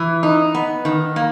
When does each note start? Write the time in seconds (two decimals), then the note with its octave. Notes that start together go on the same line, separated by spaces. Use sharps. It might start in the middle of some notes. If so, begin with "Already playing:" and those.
Already playing: E3
0.23 D#4
0.55 B3
0.85 D#3
1.16 A#3